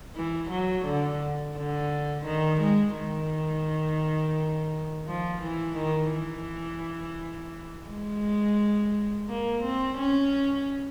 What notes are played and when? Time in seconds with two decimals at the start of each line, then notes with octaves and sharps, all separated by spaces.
0.16 E3
0.50 F#3
0.86 D3
1.57 D3
2.26 D#3
2.61 G#3
2.97 D#3
5.08 F3
5.42 E3
5.77 D#3
6.13 E3
7.88 G#3
9.29 A#3
9.64 C4
9.98 C#4